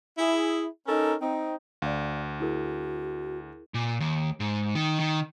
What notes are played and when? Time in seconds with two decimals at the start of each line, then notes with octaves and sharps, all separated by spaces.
0.18 E4 G#4
0.87 C#4 D#4 A4 A#4
1.21 C4 D#4
1.82 D2 D5 F5
2.40 E4 F#4 G#4 A#4
3.74 A#2
4.00 D#2
4.40 G#2
4.75 D#3
5.00 D#3